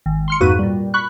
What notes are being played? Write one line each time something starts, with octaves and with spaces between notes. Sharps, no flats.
G#1
C6 F6 C#7
F2 G#2 A#3 F#4 B4 D#7
A#2 G3
B5 C#6 F#6